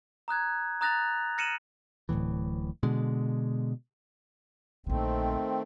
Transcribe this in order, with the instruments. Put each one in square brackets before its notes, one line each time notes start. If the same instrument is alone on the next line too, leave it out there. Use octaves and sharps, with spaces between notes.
[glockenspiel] A#5 D#6 F#6 G#6
A#5 D#6 F#6 A6 A#6 F7
F6 A#6 C#7 D#7 E7 F#7
[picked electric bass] D1 C2 A2 E3
B2 D3 G#3
[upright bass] A#1 D3 [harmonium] D#3 A3 C4